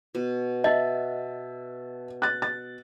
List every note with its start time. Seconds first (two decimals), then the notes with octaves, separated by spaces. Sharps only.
0.15 B2
0.64 D#5 E5 A5
2.22 F#6 A6
2.42 A6